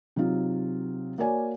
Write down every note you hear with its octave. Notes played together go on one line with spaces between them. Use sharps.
C3 F#3 D#4 F4
A#3 F#4 A#4 C#5 D5 G#5